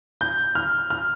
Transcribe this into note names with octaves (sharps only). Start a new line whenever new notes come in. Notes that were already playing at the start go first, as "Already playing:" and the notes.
G6
F6
F6